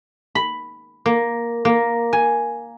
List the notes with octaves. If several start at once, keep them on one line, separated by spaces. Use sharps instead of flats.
B5
A#3
A#3
G#5